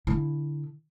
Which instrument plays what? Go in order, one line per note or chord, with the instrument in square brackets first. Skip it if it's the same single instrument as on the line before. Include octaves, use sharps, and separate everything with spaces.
[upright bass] D3 E4